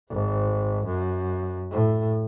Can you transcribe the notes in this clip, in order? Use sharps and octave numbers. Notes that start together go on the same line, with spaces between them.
G#1
F#2
A2